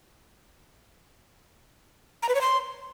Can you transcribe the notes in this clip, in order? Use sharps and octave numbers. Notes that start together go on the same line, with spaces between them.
A#5
B4
C#5
C6